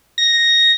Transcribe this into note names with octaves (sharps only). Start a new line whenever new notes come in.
A#6